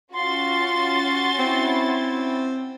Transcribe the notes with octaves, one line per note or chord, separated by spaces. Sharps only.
C#4 F4 F#4 C6 A6
C4 E4